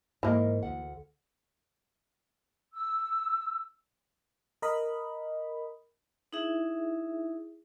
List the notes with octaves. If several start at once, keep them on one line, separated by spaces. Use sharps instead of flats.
G#2 E3 A#3 A#4 D#5
D2 F#5
E6
A#4 D#5 B5
D#4 E4 G#4 E5